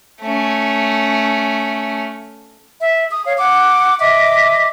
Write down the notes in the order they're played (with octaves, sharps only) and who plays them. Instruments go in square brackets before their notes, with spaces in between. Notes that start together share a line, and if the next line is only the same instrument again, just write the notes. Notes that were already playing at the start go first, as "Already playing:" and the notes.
[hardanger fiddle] A3 C#4
[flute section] E5
D#6
C#5 F5
F#5 D6
D#5 E5 D6